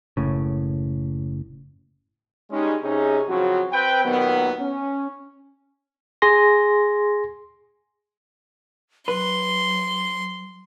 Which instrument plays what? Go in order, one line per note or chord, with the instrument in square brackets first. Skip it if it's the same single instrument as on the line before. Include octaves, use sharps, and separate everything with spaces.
[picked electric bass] F#1 A2 C#3
[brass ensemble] G3 G#3 C#4 D#4
C3 C#4 D#4 G#4
C#3 F3 F#3 C4 C#4 F#4
C4 B4 G5
D#2 A#2 D#3 F#3 B3
C#4
[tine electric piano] G#4 G#5 C6 A#6
[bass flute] F#3 [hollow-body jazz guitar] B4 [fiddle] C6